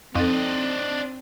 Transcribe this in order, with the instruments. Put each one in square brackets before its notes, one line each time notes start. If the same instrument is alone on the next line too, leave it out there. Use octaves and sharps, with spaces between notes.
[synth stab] F2 [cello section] C4 [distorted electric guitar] D4 D#5 [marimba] D#4 A4